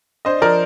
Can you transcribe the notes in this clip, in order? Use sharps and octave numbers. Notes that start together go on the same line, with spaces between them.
D4 C5 D#5
F3 A#4 D5